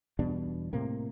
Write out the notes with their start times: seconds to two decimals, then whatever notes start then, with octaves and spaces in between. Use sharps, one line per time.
0.19 E2 B2 G3 D4
0.73 A2 C3 A#3